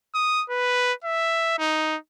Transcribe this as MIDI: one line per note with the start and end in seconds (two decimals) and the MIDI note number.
0.15 0.44 87
0.50 0.93 71
1.04 1.58 76
1.59 1.97 63